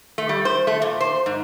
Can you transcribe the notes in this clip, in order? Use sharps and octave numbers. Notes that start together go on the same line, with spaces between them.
A3
G3
C5
A3
A#2
C5
G#2